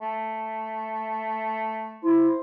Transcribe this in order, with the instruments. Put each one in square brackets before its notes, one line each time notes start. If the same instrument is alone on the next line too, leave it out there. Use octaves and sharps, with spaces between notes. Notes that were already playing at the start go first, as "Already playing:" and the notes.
[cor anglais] A3
[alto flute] E4 [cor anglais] C5